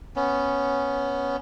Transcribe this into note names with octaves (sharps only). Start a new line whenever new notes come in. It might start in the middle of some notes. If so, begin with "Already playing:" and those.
B3 C#4